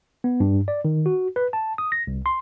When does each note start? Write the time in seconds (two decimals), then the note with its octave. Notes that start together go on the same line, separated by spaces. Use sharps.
0.24 B3
0.40 G2
0.68 D5
0.85 D#3
1.06 F#4
1.36 B4
1.53 A5
1.78 D#6
1.92 A#6
2.07 C2
2.26 C6